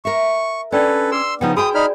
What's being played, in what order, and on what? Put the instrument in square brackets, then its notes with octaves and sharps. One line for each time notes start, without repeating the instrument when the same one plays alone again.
[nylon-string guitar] A#4 E5 [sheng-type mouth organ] C#6
[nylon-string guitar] C#4 [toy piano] D4 D5 G5 [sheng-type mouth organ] A4 B4
[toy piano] G#4 B4 D6 [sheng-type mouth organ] C6 E6
[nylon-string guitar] C#3 F3 D#4 [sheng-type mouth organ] B3 [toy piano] B4 G5
[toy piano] F#4 G#5 B5 [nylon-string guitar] G#4 C5 G5 [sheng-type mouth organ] D#6
[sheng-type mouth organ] D#4 B5 F6 [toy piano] D5